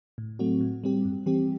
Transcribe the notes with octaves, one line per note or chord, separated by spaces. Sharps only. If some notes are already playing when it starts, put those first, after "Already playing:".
A2
F#3 A3 C4 F#4
A2
G3 C4 G4
G2
E3 G3 C4 G4